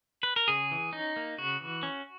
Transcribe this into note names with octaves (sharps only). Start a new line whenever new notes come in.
B4
A#4
C#3 G#4
E3
C#4 D#4
A#3
C#3 F#4
E3
C#4